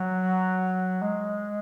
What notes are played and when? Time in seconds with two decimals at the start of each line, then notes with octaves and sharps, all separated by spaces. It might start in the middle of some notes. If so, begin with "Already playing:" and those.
Already playing: F#3
1.01 G#3